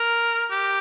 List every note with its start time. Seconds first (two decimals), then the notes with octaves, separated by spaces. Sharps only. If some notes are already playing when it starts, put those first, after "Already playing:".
Already playing: A#4
0.51 G4